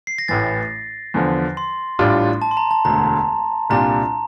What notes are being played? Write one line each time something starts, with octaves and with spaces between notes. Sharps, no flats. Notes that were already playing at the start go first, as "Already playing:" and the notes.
C7
A#6
A1 A2 E3 A6
E2 D3 F3
C6
A1 A2 G3 D4 F4
A5
C6
A#5
A5
E1 D2 D3 A#5
C2 A#2 G3 D4 F4 A#5